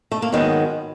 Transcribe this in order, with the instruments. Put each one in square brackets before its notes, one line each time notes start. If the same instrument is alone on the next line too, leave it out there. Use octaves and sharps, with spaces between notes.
[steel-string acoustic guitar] A3
A#3
G#2 D#3 F#3 B3